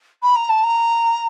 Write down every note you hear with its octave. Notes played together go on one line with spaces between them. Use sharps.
B5
A#5
A5
A#5